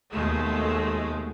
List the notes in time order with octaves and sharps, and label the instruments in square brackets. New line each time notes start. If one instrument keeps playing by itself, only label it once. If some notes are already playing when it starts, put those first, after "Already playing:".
[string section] D#2 B2 G#3 A3